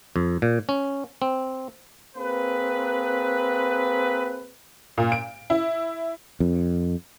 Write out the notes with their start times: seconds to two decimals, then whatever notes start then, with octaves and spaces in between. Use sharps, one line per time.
0.16 F2
0.42 A#2
0.69 C#4
1.22 C4
2.16 A#3 C4 G#4 B4
4.98 A#2
5.12 D7
5.50 E4
6.40 F2